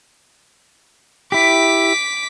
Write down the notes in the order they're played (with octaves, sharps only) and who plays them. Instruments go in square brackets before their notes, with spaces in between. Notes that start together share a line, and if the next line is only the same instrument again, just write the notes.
[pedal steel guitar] E4 G4 [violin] D6 B6